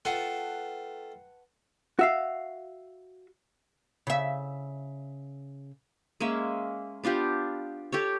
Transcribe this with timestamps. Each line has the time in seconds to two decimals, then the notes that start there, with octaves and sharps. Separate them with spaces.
0.05 A3 F4 B4 F#5 G5 A5 C7
1.99 F#4 E5 F5
4.07 C#3 E5
6.20 G#3 A#3 C#4 E5
7.04 B3 D4 F4 G4
7.92 G4 A4 C#5